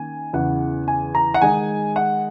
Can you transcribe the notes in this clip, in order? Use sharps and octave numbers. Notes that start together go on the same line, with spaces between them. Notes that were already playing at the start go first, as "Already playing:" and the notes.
Already playing: D#3 A#3 C#4 G#5
E2 C#3 E3 F#5
G#5
A#5
F#5
D#3 G#3 D#4 G#5
F#5